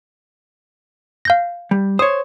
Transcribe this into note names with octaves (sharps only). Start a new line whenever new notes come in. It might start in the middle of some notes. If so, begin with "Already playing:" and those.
F5 G6 A#6
G3
C5 C#5 D#6